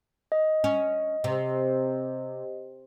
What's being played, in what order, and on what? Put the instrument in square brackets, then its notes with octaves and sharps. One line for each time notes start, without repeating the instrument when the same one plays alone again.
[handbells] D#5
[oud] C#4
C3